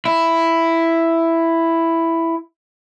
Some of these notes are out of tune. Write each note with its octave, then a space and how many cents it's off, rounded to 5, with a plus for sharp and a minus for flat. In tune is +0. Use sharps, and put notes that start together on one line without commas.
E4 +5